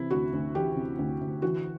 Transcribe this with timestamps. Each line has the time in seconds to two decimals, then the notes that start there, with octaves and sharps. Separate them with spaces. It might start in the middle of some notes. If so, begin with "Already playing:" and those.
Already playing: C3 E3 E4
0.11 D2 F#4
0.33 D2
0.55 E3 G4
0.76 C3
0.99 D2
1.21 D2
1.42 E3 F#4